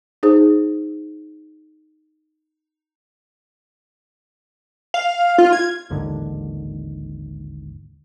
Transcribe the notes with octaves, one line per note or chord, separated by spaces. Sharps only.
D#4 G#4 C5
F5
F4
G#6
A1 D#2 G#2 D3